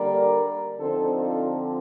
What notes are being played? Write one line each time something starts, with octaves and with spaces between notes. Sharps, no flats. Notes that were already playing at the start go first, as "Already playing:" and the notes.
Already playing: D3 G3 A#3 A#4 D5
D3 F3 C4 D#4 A4 C5
F4 A4